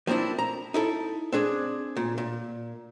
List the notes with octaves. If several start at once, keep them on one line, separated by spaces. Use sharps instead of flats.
F3 A#3 C4 D4 E4
A#5
D#4 E4 A4
C4 D4 G#4
A#2
A#2